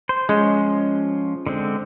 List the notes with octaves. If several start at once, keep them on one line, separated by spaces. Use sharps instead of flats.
C5
F3 G#3 C#4 C6
D3 G#3 C4